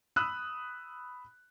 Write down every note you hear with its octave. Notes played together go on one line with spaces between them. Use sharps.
B5 D#6 E6 F#6